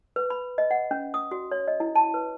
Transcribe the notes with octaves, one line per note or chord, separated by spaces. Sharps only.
B4
B5
D#5
F#5
C#4
D#6
F#4
C#5
D#5
E4
A5
B4